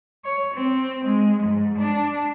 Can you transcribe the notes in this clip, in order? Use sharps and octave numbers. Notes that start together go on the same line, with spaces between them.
C#5
C4
G#3
G#2
D4